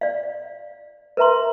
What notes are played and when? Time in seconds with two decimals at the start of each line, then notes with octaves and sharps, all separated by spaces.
0.01 D5 F5
1.17 A#4 B4 E5 A#5 C6